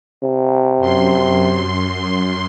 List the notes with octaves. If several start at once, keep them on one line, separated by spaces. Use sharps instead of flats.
C3
F#2 C6